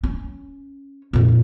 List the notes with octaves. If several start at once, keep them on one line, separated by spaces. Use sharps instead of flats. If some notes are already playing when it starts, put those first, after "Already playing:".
C#4
F2 A#2